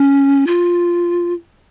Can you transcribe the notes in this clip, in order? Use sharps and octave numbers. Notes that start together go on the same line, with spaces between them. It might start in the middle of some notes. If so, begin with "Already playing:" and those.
Already playing: C#4
F4